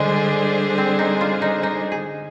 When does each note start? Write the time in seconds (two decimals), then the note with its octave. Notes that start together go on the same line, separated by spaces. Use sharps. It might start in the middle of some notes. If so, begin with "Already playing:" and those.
Already playing: D3 G3 G#3 D4 G#4 C5
0.78 C4
0.99 D#4
1.21 F4
1.42 D#4
1.63 D#4
1.92 G#4